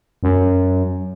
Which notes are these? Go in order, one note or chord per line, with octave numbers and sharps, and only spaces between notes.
F#2